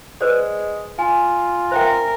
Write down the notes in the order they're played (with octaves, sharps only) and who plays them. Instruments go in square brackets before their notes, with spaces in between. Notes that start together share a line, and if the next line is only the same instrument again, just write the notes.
[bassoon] G#3 [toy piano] B4 C5 D5
[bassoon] F4 [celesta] G#5
[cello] A#4 [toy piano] C5 E5 G5